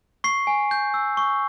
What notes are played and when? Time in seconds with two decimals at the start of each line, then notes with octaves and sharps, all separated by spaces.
0.24 C#6 C7
0.47 G#5
0.71 G6
0.94 E6
1.17 C#6